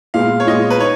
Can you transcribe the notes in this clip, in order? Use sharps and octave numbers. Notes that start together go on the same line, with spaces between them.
A#2 G#3 B3 F5
C#5
A#2 G#3 B3 D#5
B4
D#4 C#5